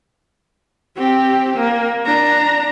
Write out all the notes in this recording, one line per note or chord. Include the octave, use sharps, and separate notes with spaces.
C4 G4
A#3
D4 A#5